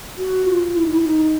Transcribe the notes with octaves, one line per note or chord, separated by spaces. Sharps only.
F#4
F4
E4
D#4
E4
D#4